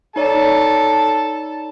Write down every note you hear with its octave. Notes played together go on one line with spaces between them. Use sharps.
D#4 A4 C#5 D5 A5